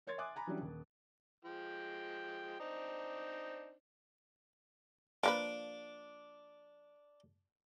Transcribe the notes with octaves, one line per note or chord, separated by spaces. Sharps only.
A#4 C#5 C6 G#6 A6
E5 G#5 C6 D6 D#6 F#6
G#5 A#5 B5
E3 F#3 G3 C#4 D4
D#1
F3 G#3 G5
C4 D4 D#4
F3 A#3 D4 B4 D6